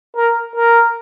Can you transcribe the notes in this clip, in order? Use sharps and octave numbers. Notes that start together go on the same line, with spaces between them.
A#4
A#4